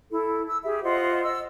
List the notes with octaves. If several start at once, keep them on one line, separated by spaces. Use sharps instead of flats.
E4 A4
E6
G4 G#4 E5
F4 C5 D#5 F#5
D#5 E6